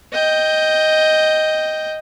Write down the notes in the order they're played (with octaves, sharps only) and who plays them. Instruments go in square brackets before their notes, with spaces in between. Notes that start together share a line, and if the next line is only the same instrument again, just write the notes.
[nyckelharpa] D#5 G5